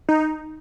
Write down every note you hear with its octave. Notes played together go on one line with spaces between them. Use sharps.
D#4